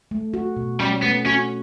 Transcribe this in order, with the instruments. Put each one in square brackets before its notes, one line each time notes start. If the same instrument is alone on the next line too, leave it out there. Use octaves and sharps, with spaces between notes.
[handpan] A3
F#4
B2
[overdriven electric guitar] G3 [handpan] C#4
[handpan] A3 [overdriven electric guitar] B3
[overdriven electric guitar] C#4 [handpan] F#4